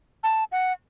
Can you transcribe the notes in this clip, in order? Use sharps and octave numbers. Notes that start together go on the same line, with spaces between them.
A5
F#5